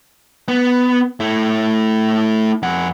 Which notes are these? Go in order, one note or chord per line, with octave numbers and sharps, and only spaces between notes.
B3
A3 E4
F2 F#5